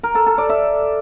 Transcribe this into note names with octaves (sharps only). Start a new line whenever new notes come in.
A#4
A4
A4
D5
E5